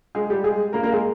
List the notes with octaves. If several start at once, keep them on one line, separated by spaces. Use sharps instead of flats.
G#3 G#4
G3 G4
G#3 G#4
A#3 A#4
A#3 A#4
G#3 G#4